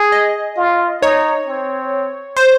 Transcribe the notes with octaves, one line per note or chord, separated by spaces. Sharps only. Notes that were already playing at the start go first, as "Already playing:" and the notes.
Already playing: G#4
D#5
F4
D#4 C#5
C4
C5